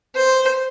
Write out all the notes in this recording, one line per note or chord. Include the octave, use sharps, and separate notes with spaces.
C5